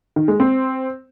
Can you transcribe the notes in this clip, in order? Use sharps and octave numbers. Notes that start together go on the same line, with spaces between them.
D#3
G#3
C4